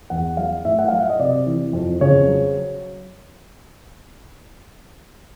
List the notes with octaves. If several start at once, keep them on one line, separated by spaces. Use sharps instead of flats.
E2 F#5
F#3 F5
A2 E5
F#5
F#3 F5
E5
D#5
C3 D5
E3
F2
C#3 C#5
F#3